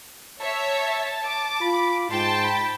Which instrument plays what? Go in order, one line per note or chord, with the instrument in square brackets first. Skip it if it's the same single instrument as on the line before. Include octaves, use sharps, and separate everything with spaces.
[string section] C#5 E5 [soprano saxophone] A5
[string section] D6
[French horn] F4 [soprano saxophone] B5
[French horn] G#2 [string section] G5 A5 [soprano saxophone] C6
[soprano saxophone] B5